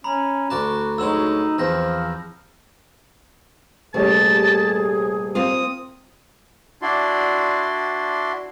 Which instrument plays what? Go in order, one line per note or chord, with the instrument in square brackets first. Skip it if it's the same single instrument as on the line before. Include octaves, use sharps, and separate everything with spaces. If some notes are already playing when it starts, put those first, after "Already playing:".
[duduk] C#4 [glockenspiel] A#5 B5
[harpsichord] D2 D5 A5 [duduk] F#4
[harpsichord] D2 F#3 G#3 [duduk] D#4 [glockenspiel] E6 E7 F#7
[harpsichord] E2 C4 [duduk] F3 [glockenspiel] F6 G6 A#6
[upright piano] D#1 C3 C#4 [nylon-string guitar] A3 [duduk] G#4 [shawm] A5
[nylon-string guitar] A#3 C4 F4 [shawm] D#6
[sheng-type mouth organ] D4 E4 F#4 D5 C6